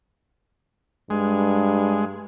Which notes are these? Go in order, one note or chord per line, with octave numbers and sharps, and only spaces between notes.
G2 G#3